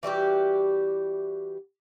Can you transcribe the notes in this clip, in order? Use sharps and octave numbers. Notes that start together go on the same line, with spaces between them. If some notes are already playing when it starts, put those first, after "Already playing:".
E3 G3 F#4 G4